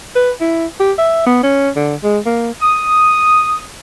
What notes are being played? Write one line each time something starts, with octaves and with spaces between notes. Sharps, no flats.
B4
E4
G4
E5
B3
C#4
D3
G#3
A#3
D#6